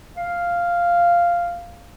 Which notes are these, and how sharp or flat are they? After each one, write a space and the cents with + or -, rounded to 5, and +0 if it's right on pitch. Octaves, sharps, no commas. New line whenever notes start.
F5 -5